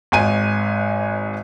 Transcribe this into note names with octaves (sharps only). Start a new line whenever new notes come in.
G#1 G#2 G#5 D#7